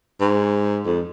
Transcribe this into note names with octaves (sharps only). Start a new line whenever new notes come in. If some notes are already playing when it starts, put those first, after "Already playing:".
G#2
F2